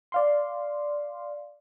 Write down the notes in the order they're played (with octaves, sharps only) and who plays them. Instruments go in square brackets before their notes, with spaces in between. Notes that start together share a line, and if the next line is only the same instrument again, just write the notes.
[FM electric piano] D5 F5 C6